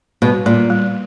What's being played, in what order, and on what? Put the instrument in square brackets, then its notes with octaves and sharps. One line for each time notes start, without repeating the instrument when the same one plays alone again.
[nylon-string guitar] B2 [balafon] G3
[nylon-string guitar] A#2 [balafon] G3
[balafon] G3